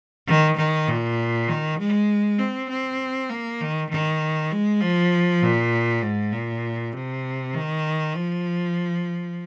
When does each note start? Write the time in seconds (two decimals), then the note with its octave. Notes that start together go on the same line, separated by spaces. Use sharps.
0.27 D#3
0.57 D#3
0.88 A#2
1.48 D#3
1.79 G#3
2.39 C4
2.69 C4
3.30 A#3
3.61 D#3
3.90 D#3
4.51 G#3
4.81 F3
5.42 A#2
6.02 G#2
6.33 A#2
6.93 C3
7.54 D#3
8.15 F3